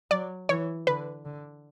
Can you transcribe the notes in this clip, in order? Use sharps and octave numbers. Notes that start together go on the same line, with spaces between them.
F#3 D5
E3 C#5
D3 B4
D3